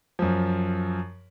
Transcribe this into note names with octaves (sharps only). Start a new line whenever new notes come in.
F#2 F3